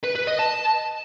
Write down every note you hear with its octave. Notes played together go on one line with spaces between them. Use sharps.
B4
B4
D#5
A5